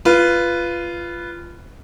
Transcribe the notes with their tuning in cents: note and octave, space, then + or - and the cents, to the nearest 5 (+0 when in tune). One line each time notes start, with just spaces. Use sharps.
F4 -15 B4 +0